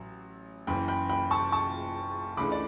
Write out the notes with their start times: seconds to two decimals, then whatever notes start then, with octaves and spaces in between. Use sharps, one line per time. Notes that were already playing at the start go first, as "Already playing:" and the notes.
Already playing: A1 F#3
0.67 F#1 F#2 E3 G5 B5
0.88 G5 B5
1.09 G5 B5
1.31 A5 C#6
1.52 A5 C#6
2.37 C#2 C#3 E3 A3 D4 B5 D6
2.52 D5